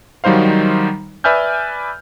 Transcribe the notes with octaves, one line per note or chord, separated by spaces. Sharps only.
D#3 F#3 G3 D#4 C5 F5
B4 D5 E5 G#5 F6 G6